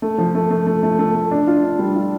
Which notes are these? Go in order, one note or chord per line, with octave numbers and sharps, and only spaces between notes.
A3
F3
A3
A3
A3
A3
A3
A3
D4
F4
D4
G3
F4